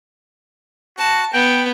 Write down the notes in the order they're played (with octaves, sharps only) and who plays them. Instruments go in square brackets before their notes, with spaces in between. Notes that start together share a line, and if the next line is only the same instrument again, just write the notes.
[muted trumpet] F#4 [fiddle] A5
[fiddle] B3 [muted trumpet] G5